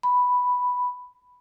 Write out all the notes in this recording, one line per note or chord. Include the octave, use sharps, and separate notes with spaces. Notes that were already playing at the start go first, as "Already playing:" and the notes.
B5